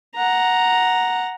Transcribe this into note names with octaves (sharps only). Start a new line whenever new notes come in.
F#5 A#5